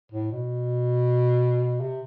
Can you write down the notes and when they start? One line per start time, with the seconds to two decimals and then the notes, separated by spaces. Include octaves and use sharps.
0.12 A2
0.31 B2
1.80 C3